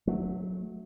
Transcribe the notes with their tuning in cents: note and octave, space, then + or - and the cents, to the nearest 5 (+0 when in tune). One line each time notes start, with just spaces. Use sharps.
F#3 -15 A3 -15